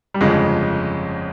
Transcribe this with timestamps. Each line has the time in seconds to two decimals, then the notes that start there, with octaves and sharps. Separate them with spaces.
0.14 G3
0.21 G1 F2 C#3 F3 G#3